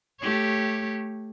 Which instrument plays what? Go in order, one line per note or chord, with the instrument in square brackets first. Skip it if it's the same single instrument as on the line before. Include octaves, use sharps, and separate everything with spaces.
[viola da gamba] A3 G4 C#5